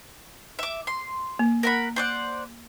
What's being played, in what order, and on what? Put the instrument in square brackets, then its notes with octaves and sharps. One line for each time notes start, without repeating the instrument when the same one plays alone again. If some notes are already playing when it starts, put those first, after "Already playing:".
[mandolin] E5 D6
C6
[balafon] A#3
[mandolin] A#4 F#5 B5
C5 D5 F#5